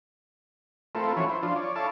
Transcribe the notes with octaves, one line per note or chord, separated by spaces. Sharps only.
A3 C4 E4 F4 A4 A#4
E3 F3 C#4 E4 F#4 C#5
E4 C5
F3 D4 F4
C#5 D5
E4 A4 C#5 F5 A5 D6